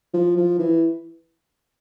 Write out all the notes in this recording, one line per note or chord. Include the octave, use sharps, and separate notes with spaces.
F3
F3
E3